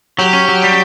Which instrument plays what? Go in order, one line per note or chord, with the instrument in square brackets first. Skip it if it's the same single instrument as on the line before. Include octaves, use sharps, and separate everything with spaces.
[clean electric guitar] F#3 [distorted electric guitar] G4
[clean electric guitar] C#4
F#3
G3